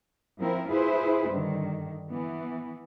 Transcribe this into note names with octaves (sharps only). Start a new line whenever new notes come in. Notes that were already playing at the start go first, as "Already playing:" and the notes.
F3 C4 E4 A#4
E4 F4 G#4 B4 C5 E5
G2 D3 D#3
E3 B3